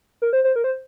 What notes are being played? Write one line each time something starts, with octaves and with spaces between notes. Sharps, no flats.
A#4
C5
C5
A#4
C5